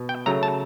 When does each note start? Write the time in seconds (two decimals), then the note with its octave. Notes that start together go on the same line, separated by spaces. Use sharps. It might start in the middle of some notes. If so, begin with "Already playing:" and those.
Already playing: B2
0.09 G5
0.26 C#3 F#3 A3 A#5
0.43 A5